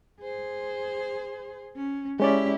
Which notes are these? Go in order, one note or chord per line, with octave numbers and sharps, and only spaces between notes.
G#4 C5
C#4
G#3 C#4 E4 G4 D5